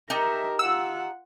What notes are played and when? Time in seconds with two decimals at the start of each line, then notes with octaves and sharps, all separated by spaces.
0.10 D#4 G4 A#4 E5 A5
0.59 F4 F#5 E6